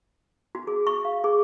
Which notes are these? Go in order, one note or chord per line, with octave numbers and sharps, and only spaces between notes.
F#4
G#4
C#6
F5
G#4